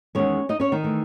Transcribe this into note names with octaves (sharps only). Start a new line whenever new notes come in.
E2 D#3 G#3 C#4 C#5
D#4 D#5
C#4 C#5
D#3 D#4
E3 A3